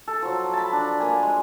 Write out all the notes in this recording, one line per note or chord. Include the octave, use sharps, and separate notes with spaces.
A4
F3 F#3
A5 B5
D4
A#3 G#5
G#3